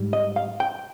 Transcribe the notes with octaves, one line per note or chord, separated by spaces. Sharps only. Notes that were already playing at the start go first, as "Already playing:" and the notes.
Already playing: G#2 G3
D#5
F5
G5